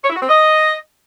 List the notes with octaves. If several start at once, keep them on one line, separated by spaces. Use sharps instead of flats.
C#5
E4
F#4
C4
D#5